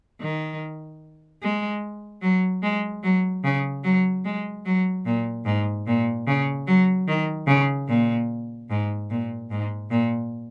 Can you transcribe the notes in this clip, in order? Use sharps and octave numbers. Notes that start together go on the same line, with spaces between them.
D#3
G#3
F#3
G#3
F#3
C#3
F#3
G#3
F#3
A#2
G#2
A#2
C#3
F#3
D#3
C#3
A#2
G#2
A#2
G#2
A#2